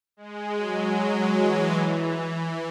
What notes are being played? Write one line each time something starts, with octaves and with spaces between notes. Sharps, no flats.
G#3
F#3
F#3
E3
E3